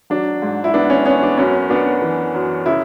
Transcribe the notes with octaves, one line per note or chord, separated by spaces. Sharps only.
F#3 D4
G#2
E4
B3 D4
C#4
B3 C#4
D4
F#2 C#4
B3 D4
E3
F#2
C#3 E4